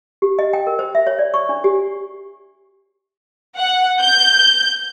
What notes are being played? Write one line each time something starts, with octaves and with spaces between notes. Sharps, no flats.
G4
D#5
G5
A#4
C5
E5
C#5
D5
C#6
D4
G4
F#5
G6